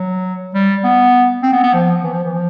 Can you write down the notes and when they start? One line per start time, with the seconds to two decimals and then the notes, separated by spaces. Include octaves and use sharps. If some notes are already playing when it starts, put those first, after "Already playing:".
Already playing: F#3
0.54 G3
0.84 B3
1.43 C4
1.53 B3
1.64 B3
1.74 F3
2.03 E3
2.13 F3
2.23 E3
2.33 F3